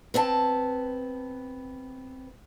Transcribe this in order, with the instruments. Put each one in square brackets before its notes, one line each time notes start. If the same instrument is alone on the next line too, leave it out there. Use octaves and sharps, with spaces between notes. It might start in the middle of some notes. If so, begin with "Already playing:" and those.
[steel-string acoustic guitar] B3 C4 A5